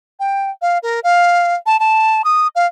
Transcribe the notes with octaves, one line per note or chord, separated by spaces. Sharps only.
G5
F5
A#4
F5
A5
A5
D#6
F5